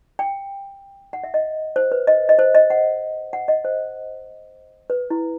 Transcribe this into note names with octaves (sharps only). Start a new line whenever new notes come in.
G5
F#5
E5
D#5
C5
B4
D#5
D#5
C5
D#5
F#5
F#5
D#5
C5
B4
E4